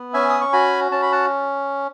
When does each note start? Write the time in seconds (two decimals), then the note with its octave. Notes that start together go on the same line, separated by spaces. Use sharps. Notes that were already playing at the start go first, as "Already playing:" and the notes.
Already playing: B3
0.13 C#4 E5 G#5
0.29 D#6
0.41 C#6
0.53 F#4 G#5 B5
0.92 C#4 A5
1.02 B5
1.12 F#5 A5